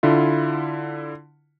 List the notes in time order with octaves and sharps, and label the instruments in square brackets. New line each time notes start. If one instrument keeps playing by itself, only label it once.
[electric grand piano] D3 E4 F4